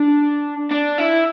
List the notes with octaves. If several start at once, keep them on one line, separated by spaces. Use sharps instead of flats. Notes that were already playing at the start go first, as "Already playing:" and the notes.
Already playing: D4
D4
E4